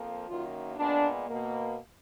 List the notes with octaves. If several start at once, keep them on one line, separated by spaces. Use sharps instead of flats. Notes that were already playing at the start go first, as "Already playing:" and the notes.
Already playing: F2 F3 A#3
F#2 D#3 A#3 F4
A#2 G#3 B3 D4
B2 A#3